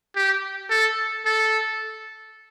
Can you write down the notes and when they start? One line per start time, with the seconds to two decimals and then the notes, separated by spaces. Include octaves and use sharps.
0.16 G4
0.70 A4
1.25 A4